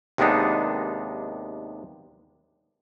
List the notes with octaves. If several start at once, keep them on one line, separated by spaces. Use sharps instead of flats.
D#2 C3 G#3 B3 D4 D#4